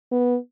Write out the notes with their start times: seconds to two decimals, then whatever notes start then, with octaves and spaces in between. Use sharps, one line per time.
0.12 B3